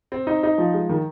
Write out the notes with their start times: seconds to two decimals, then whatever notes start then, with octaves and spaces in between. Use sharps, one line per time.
0.12 C4
0.27 D#4
0.43 D#4
0.58 F3
0.74 G#3
0.89 D#3